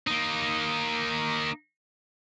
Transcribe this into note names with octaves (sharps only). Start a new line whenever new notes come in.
A#3 D#4